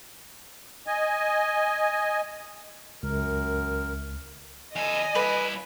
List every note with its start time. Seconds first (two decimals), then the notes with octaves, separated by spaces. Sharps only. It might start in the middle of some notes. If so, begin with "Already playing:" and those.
0.87 D#5 G#5
3.03 C#2 F#2 A#4
4.76 E2 A4 D#5 G#5
5.15 G2 E4 B4